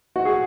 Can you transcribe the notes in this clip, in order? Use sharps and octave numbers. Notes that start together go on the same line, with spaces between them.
F#4
G#4